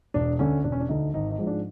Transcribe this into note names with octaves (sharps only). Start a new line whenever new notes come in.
E1 D4
D2 D3 C#4
E1 D4
C#4
D4
D2 D3 D#4
G#1 D#4
D#4
G#2 F3 G#3
D4